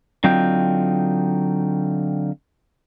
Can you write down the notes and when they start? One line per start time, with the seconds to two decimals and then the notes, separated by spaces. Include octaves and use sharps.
0.24 D3 F#3 C4 D#4 F4 G5